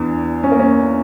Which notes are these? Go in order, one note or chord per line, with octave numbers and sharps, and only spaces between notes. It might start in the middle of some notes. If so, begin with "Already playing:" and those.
Already playing: E2 E3 D4
C#4
A#3
C#4